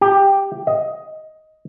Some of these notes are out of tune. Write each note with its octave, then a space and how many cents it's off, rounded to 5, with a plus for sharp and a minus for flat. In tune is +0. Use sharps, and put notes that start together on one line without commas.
G4 +5
D#5 +10